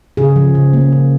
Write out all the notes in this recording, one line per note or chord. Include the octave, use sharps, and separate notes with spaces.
C#3 G#4
F3
C#3
A#3
C#3